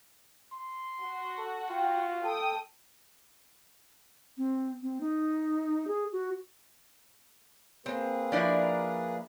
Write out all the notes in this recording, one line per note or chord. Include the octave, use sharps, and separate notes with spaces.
C6
F#4
A4
F4 G5
A4 G5 D#6
C4
C4
D#4
G#4
F#4
A#3 C4 G#4 B4
F3 D4 E4 D5 A#5